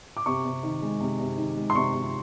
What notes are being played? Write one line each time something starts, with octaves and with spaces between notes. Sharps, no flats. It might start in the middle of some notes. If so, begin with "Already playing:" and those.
D6
C3 C#6
C3
D#3
G#3
C3
C3
D#3
G#3
C6
C3 C#6
C3